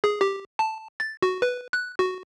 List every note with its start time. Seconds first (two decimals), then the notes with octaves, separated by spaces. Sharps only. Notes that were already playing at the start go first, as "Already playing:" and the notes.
0.04 G#4
0.21 G4
0.59 A5
1.00 A6
1.22 F#4
1.42 B4
1.73 F#6
1.99 F#4